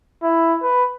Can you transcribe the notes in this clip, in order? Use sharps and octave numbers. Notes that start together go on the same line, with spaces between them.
E4
B4